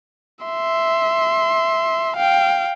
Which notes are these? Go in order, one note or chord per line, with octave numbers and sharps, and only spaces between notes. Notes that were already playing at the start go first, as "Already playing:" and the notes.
E5 C6
F5 G5